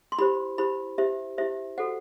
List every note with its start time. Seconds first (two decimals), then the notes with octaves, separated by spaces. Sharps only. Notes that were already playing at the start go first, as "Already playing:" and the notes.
0.12 C6
0.18 E4 G4 C5 B5
0.58 E4 G4 C5 B5
0.98 E4 G4 C5 E5
1.38 E4 G4 C5 E5
1.78 F#4 A4 C5 F#5